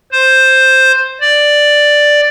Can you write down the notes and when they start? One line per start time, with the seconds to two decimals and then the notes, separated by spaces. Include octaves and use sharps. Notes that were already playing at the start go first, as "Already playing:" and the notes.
0.12 C5
1.21 D5